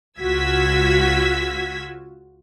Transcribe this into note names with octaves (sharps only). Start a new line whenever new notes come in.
C#2 F4 F#4 E6 G#6 B6